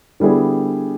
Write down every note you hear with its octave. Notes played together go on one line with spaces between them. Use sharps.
D3 G3 B3 E4 G#4